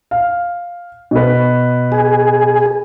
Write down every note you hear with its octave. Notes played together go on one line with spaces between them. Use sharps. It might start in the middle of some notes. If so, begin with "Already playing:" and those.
F5
B2 B4
G#4